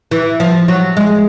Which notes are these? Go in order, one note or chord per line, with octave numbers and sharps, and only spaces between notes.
E3
F3
F#3
G#3